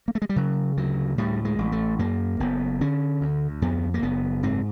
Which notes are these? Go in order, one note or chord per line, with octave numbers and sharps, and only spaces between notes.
A#3
A3
G#3
G3
C#3 F#3
D2 F#3
A2 G3
G#3
A1
A3
F#2 A#3
F#1 B3
D3 C#4
D2
F2 B3
A#3
F#1 B3
G#2 C4